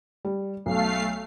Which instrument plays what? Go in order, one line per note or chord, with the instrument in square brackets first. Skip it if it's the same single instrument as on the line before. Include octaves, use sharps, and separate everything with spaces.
[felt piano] G3
[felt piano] B1 [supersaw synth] A3 F5 C7